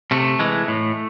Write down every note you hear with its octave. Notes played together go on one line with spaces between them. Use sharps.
C3 A3
E3 G#3
A2